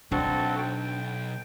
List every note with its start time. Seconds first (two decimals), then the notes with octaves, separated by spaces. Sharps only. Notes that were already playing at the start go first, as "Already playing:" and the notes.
0.12 B1 C4 D4 F#4 A4
0.58 G5